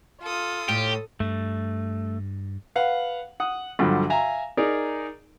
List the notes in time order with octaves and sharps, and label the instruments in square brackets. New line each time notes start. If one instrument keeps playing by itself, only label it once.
[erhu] F4 [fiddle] A4 D#6
[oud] A2 [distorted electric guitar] G4
[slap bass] G2 [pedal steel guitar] A3
[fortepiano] B4 F5 F#5
F#5 D#6
B1 G2 D3 F3
E5 F5 G#5 A#5
D#4 G#4 A#4 D5